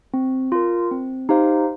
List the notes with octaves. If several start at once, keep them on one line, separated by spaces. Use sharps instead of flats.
C4
F4 A#4
C4
D#4 G4 C5 F5